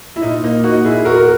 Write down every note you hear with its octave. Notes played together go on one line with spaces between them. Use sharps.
E4
A#2 D#4
A#3 D#4
A#3 D#4 F#4
A#2 E4 G#4
E2 F#4 A#4
A#4